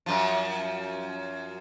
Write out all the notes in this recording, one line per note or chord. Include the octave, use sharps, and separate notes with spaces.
F#2 F3